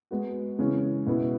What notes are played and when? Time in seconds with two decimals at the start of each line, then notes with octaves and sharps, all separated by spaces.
0.11 G#3 B3 F#4
0.59 C#3 E3 G#3 C#4
1.06 B2 B3 E4